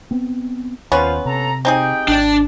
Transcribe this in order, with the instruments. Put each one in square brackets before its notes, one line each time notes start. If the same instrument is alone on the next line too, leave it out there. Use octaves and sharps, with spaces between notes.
[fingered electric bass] B3 C4
[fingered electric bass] D#2 [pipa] B3 C#4 B4 [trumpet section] F4 C5
[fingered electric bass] C3 [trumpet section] A4 A#5
[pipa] C4 D#4 G#4 [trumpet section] G4 G5
[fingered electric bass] G#1 [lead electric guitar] D4 D5